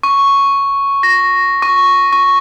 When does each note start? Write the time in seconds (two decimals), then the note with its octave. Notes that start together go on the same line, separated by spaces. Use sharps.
0.03 C#6
1.03 A#6
1.62 C#6
2.13 C#6